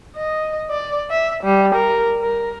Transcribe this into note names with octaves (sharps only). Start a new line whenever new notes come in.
D#5
D5
E5
G3
A#4
A#4